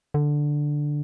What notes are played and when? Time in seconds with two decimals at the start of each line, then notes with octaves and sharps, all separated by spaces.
0.14 D3